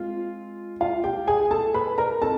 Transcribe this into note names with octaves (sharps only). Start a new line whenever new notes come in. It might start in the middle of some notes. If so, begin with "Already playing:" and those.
Already playing: G#3 C4 F4
F4 F5
G4 G5
G#4 G#5
A4 A5
B4 B5
A#4 A#5
C4 D#4 A4 A5